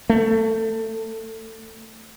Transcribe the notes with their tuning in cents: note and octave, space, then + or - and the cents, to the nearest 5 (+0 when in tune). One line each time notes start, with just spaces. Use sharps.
A3 +20